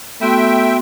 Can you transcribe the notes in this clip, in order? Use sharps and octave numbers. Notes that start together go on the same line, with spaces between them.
A3 B3 F#4 E5 G5 C6